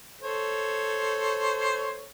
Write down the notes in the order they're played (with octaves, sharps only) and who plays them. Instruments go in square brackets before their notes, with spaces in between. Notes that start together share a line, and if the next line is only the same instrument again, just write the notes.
[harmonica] A4 C5 C#5